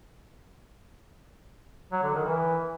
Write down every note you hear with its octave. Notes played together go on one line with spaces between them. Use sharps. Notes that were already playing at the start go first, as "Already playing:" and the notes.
F#3
D3
D#3
E3